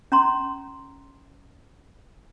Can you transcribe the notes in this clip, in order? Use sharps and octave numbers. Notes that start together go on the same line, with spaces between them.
C#4 A#5 C6